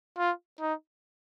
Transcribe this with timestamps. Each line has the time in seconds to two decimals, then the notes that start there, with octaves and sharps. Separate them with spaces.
0.18 F4
0.60 D#4